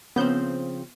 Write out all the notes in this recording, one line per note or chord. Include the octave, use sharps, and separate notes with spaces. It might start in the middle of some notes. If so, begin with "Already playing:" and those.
C#3 F3 B3 C4 G6